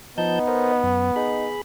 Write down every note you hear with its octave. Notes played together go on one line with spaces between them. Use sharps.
F3 B3 D#4 A5 G6
A#4 C5 D#5
F#2
D#4 G#4 B5